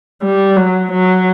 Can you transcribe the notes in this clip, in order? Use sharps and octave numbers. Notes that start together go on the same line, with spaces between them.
G3
F#3
F#3